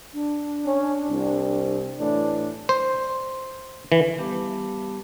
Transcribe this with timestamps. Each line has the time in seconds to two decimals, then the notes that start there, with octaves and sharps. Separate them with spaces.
0.14 D4
0.64 C#4
1.08 C2
1.98 A2 E3 D4
2.69 C5
3.92 E3
4.18 G3 B3 G4 F5 A5 D6